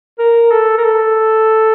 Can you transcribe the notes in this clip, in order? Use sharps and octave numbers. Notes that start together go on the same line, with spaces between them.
A#4
A4
A#4
A4